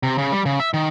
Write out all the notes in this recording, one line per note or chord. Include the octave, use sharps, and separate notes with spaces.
C3
C#3
G3
C#3
E5
D#3